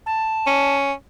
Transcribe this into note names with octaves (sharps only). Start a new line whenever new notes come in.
A5
C#4